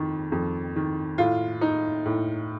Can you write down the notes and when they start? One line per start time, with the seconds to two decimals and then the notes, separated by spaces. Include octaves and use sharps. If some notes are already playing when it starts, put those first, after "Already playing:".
Already playing: F2 D#3
0.32 F2
0.76 D#3
1.18 A2 F4
1.61 D#4
2.05 A2